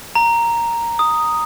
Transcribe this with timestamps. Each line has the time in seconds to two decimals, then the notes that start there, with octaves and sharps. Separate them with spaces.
0.15 A#5
0.99 D#6